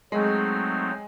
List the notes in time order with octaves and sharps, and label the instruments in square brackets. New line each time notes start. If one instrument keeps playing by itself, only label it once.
[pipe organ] F#3 A3 C4 D#4 [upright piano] G#3